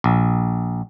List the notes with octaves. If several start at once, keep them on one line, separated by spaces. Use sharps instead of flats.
A#1